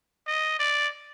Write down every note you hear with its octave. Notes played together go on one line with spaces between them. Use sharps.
D#5
D5